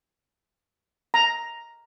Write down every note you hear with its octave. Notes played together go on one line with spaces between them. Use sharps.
A#5